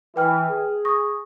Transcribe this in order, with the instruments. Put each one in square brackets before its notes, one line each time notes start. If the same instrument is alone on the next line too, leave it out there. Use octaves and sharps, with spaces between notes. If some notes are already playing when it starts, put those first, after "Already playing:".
[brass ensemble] E3 [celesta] B4 G5 F6
[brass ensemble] G#4
[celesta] C#6 D#6 A#6